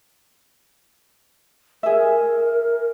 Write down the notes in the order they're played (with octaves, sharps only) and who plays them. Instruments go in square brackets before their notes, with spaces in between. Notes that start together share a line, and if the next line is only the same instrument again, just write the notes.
[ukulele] G#4 E5 [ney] A#4